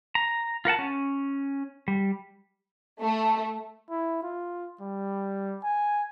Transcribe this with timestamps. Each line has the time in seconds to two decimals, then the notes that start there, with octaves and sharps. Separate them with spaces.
0.15 A#5
0.65 F4 A#4 F#5 A5
0.79 C#4
1.88 G3
3.00 A3
3.90 E4
4.23 F4
4.80 G3
5.63 G#5